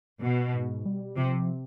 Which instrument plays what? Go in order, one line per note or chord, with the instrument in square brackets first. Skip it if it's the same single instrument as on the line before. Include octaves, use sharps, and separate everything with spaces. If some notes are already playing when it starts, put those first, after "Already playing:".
[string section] B2
[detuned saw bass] G#2
G3
[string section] C3 [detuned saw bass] F3